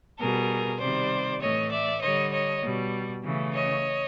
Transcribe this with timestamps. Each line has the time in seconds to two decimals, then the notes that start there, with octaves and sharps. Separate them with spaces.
0.18 B2 G3 G#4 A#4
0.80 C3 D#3 G3 C5 D5
1.41 A2 E3 A3 C#5 D#5
1.70 D5 E5
2.01 D3 G3 C#5 D#5
2.32 C#5 D#5
2.62 B2 G3
3.23 C#3 E3 A3
3.53 C#5 D#5